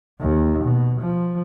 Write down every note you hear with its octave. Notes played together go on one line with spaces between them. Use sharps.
D#2
B2
F3